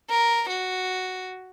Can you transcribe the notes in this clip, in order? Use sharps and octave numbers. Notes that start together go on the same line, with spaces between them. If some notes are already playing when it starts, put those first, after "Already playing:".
A#4
F#4